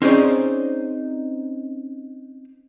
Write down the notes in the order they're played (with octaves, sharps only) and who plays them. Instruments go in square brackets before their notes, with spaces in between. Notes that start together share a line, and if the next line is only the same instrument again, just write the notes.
[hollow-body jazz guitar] C4 C#4 D#4 G#4 C5 D5